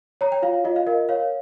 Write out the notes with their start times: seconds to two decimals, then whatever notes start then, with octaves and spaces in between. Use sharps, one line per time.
0.21 C#5 A#5
0.32 G5
0.42 F4 F5
0.65 F4 D#5
0.76 F5
0.87 A#4 D#5
1.09 C#5 F5